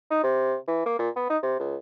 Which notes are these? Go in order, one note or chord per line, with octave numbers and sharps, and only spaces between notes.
D#4
C3
E3
A#3
A#2
B3
D#4
C3
C#2